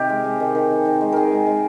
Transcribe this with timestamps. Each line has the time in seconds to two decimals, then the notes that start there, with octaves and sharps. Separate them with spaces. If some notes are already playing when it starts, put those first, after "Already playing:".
Already playing: C3 D#3 G4 A#4 D#5
0.09 G#3
0.24 G#3
0.40 D#3
0.55 D#3
0.70 D#3
0.85 D#3
1.01 G#3
1.12 D#3 G#4 A#4
1.32 G#3
1.47 G#3